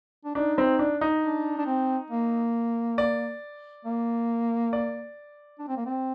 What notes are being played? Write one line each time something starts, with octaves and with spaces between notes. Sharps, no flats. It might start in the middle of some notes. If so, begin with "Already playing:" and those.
D4
D4 D#4
C4
D4
D#4
D4
D4
C4
A#3
D5
A#3
D5
D4
C4
A#3
C4